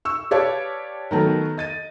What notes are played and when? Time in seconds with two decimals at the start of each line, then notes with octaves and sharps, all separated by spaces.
0.05 C#6 E6
0.31 G4 B4 C#5 D5 F5 A5
1.11 D#3 F#3 A3 B3 A#4
1.57 D#5 A6 D#7